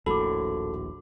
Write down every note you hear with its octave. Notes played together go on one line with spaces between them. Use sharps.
D#1 A#1 A2 F#4 A4 B5 D6